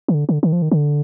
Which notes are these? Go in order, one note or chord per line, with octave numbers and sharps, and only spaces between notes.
D#3
D3
D3
D#3
F3
D#3
D3